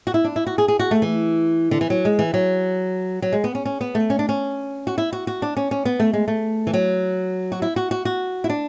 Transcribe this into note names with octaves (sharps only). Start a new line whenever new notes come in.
F#4
E4
D4
E4
F#4
G#4
G#4
F#4
A3
E3
D3
E3
F#3
G#3
E3
F#3
F#3
G#3
B3
C#4
C#4
B3
A3
C#4
D4
C#4
F#4
E4
F#4
F#4
D4
C#4
C#4
B3
A3
G#3
A3
E3
F#3
F#4
E4
F#4
F#4
F#4
E4
D4